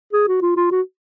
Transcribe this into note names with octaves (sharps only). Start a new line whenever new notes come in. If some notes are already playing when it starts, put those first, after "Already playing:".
G#4
F#4
F4
F4
F#4